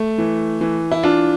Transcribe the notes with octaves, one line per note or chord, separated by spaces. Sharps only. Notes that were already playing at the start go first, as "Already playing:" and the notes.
Already playing: A3
E3
E3
E4
D4 F4